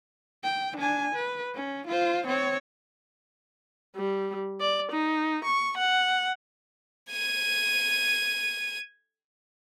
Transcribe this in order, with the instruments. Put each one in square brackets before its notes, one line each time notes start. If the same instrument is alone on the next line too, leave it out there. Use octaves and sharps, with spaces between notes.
[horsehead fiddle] G5
D4 G#5
B4
C#4
F4 C5
C4 C#5
[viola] G3
D5
D#4
C#6
F#5
[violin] G#6 D#7